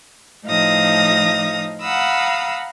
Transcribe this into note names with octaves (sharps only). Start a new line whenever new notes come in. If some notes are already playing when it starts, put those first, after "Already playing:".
A2 F3 D#4 F5 D#6 A#6
F5 F#5 A#5 B5 D#6 E6